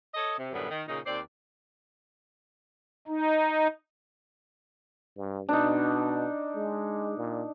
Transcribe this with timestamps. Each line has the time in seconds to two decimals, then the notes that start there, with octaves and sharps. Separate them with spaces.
0.14 A4 C#5 D#5
0.38 C3
0.52 F#2 A2 D3 G3 B3
0.70 D#3
0.87 A#2 C#3 D#4
1.05 D#2 C4 C5 D5
3.08 D#4
5.17 G2
5.49 B2 D4 D#4
6.55 G#3
7.18 A#2